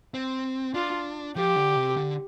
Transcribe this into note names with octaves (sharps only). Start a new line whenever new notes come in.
C4
D4 F4
F3 G4
D3
C3
D3